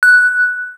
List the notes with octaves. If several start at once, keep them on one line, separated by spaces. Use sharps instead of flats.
F#6